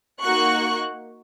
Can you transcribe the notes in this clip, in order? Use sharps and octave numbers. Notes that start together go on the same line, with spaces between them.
A#3 D#4 F#4 C#6 F#6